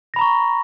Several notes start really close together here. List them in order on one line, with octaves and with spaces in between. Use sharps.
A#6 B5 A#5 C#6